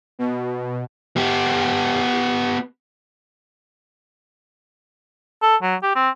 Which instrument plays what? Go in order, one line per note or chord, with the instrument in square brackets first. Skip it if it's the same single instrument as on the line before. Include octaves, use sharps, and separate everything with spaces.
[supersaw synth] B2
[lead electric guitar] B3 G4
[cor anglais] A4
F#3
G4
C4